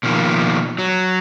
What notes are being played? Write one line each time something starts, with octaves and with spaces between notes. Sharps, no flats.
B2 D#3 F3 A#3
F#3